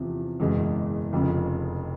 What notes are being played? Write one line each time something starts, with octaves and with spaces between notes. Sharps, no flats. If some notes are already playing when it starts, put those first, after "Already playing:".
Already playing: E2 C3 F3
F#1 E2 B2 G#3
F1 F2 C#3